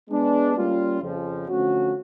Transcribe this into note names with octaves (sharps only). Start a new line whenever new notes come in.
G#3 B3 D4
G3 A#3 C#4 F4
F2 C#3 F3
D3 F3 A3 C#4 F#4